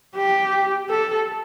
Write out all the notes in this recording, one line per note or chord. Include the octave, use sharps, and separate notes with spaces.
G4
A4